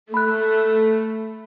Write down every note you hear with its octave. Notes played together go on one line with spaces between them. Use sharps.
A3 B5 F#6